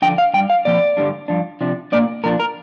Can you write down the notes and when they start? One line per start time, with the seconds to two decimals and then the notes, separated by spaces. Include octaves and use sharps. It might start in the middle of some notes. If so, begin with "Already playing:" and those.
0.02 D3 F3 D4 G5
0.18 F5
0.34 G2 G3 G5
0.50 F5
0.65 A#2 F3 C4 D5
0.97 G2 D3 G3 D4
1.28 G2 F3 D4
1.61 C3 F3 D4
1.92 A#2 A#3 D4 D5
2.24 A#2 F3 D4 A#4
2.40 A#4